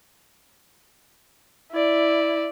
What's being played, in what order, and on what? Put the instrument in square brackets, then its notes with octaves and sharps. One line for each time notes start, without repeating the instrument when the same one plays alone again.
[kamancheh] E4 D5